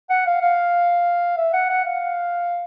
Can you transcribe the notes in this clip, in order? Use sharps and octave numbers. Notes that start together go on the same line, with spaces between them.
F#5
F5
F5
E5
F#5
F#5
F5